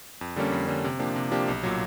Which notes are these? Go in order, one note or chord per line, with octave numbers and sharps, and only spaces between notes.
F2
D3 G3 A#3 C#4
F2
D3 G3 A#3 C#4
C3
F3 A#3 D4 G4
C3
F3 A#3 D4 G4
B1
A#2 F#3